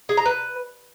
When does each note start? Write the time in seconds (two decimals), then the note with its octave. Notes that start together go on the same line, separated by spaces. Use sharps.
0.09 G#4
0.17 A#5
0.26 B4